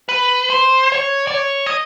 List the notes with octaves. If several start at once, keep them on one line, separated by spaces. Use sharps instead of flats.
B4
C5
C#5
D5
C#5
D#5